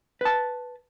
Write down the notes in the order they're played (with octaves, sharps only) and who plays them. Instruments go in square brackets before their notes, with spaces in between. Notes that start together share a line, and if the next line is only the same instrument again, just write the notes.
[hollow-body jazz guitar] B4 A5